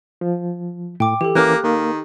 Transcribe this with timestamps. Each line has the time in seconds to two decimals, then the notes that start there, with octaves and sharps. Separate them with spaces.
0.21 F3
1.00 A2 G5 D6
1.21 E3 G4 A4
1.35 E3 A#3 C#4 A#4 D6 F6 F#6
1.64 D#3 A#3